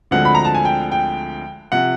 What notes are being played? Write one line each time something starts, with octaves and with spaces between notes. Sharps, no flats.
D2 D3 F3 G#3 C4 F#5
B5
A#5
A5
G#5
G5
G5
C3 F3 F#5